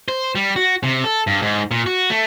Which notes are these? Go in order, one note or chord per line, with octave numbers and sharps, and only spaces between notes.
C5
G3
F#4
C3
A4
G2
G#2
A#2
F#4
A3